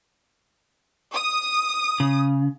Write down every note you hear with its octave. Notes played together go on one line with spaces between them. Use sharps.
D#6
C#3